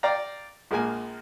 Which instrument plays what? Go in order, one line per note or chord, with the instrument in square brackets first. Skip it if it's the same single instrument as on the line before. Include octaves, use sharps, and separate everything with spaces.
[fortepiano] D5 F5 G5 A#5
A#1 G#3 A#3 G#5